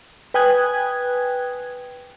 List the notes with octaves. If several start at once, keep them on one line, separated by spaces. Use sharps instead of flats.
B4 G5 G#5 D#6 F#6 G#6